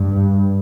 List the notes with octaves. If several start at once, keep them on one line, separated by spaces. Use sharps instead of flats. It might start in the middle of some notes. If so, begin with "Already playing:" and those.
Already playing: G2